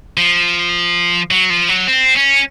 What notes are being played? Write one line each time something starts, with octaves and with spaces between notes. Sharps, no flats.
F3
F#3
F3
F#3
C4
C#4